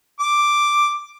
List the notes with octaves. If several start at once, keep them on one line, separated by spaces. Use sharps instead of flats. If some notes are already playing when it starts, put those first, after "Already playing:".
D6